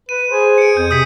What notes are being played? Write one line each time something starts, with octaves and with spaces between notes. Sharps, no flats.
B4 D#7
G#4 C5
C#7 D7
F2 G6
C3 D#6 G6 B6